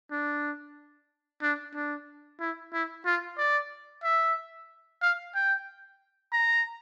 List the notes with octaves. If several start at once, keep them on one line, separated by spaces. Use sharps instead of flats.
D4
D4
D4
E4
E4
F4
D5
E5
F5
G5
A#5